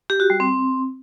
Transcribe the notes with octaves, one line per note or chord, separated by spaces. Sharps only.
G4
F#4
G3
C4